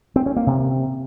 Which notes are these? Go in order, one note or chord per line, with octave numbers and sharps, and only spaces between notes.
C4
C#4
A#3
C3